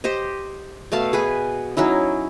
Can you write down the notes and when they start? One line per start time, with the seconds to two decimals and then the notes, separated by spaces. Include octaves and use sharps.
0.04 G4 C5 D#5
0.92 B2 A3 F5 A5
1.13 G#4 B4 G#5
1.77 F#3 C#4 D#4 E4